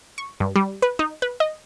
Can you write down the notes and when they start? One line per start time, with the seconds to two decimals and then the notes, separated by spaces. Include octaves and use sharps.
0.18 C#6
0.40 G2
0.56 G3
0.82 B4
0.99 D#4
1.22 B4
1.40 D#5